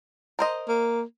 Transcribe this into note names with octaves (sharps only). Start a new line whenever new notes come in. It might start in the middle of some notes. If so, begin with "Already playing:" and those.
A#4 C5 D#5
A#3